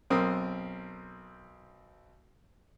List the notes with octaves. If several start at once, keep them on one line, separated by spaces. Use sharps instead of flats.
B1 C4 A#4 D#6